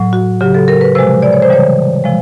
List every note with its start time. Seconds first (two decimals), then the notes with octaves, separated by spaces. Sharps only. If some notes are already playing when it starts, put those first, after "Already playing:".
Already playing: A2 F#3
0.13 F#4
0.41 C#3 F#3 G4
0.54 A4
0.68 A#4
0.81 B4
0.95 C3 F3 G#3 C5
1.22 D5
1.33 C#5
1.42 C5
1.50 C#3 E3 G3 C#5
2.04 C3 F3 G#3